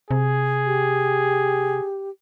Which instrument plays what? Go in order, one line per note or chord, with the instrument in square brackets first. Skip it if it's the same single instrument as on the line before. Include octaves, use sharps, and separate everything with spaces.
[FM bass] C3 [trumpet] G#4
[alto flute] G4